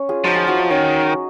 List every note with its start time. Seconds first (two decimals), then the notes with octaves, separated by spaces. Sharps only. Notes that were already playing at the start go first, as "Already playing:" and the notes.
Already playing: C#4
0.09 F4 G#4
0.24 F3 D#4 F#4
0.36 F4 G#4
0.48 D#4 F#4
0.59 D#4
0.70 D#3 C#4